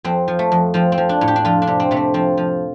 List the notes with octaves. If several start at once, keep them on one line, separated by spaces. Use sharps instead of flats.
F2 C4
F3
A3
F2
F3 C4
C4
F3
D4
A2
G4
D4
F2 F4
D4
C3
C4
C3 A3
C4
F3 C4
F3